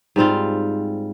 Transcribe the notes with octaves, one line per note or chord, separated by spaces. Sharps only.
G#2 G3 C4 F4